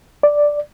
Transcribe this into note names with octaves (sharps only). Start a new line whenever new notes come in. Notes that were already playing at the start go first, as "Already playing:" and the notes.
D5